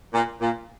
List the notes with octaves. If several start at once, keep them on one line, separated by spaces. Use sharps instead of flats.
A#2
A#2